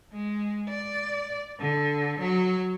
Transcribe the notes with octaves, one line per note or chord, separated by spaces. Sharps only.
G#3
D5
D3
F#3